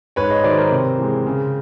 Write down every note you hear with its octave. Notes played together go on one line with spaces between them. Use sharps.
G#2 B4 C#5
C#5 D#5
D#3 F#3 C5 D5
A#4 C5
C3
E3 G#3
C#3